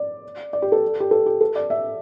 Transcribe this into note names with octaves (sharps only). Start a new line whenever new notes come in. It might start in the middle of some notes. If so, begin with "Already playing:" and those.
Already playing: D5
D5
G4
A4
G4
A4
G4
A4
D5
E5